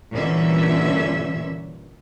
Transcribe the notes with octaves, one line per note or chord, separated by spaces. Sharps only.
G2 A#2 D3 E3 C#4 E5